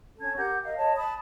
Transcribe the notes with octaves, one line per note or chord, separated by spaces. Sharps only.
C#4 A4 G#6
G4 A#4 F#5 G6
A#4 D#5 F5
A4 C#5 D#5 A5
A5 B5 D#6